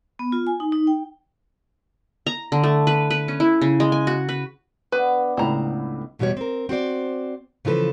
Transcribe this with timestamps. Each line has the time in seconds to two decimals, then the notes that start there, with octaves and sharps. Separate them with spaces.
0.19 B3
0.32 F4
0.47 G#5
0.60 D#4
0.72 D#4
0.87 G5
2.26 A#5
2.52 D3
2.63 A3
2.87 B4
3.10 B4
3.28 C#4
3.40 E4
3.61 C#3
3.80 G#3
3.92 G#5
4.07 F#4
4.29 B4
4.92 D3 B3 D4 B4
5.37 C#2 A2 C4 A#5 B5
6.19 E2 B2 G3 F#4 C#5
6.37 C4 A#4
6.69 C4 F#4 C5 D5
7.65 C#3 E3 F3 A4 B4